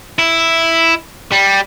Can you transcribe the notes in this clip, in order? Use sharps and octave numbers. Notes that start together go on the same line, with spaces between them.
E4
G3